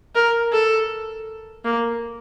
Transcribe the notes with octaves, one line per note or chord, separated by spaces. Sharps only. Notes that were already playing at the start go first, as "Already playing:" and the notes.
A#4
A4
A#3